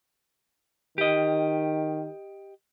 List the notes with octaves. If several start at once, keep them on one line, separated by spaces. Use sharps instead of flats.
D#3 G4 D#5